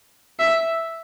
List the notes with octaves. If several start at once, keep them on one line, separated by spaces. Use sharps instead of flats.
E5